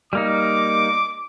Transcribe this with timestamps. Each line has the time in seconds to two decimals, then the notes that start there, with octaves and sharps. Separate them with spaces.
0.13 G3 A#3 D#4 D6